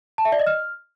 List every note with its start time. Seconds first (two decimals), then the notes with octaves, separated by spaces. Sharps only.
0.18 A5
0.25 E5
0.32 D5
0.39 D#5
0.47 F6